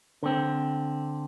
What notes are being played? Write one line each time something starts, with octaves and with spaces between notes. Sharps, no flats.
D3 C4